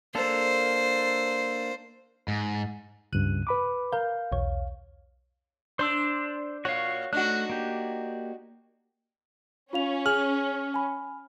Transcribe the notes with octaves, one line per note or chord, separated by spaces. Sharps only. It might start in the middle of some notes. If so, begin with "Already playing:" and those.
A#3 D4 A4 C5
G#2
C#2 G2 C#3 F#6 D#7
B4 B5 D6
A#4 F5 G6
B1 E2 C#5
D4 C5 C6 E6
A#2 F#4 C#5 F5
A3 D4 D#4 F#4 F#6
A#3 G4
C#4 F4 F5 F7
G#4 G#5 F6 F#7
G#5 B5